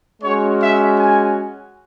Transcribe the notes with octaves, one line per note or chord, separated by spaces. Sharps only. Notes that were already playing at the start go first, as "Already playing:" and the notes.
G#3 C#4 F#4 C#5
E5
G#5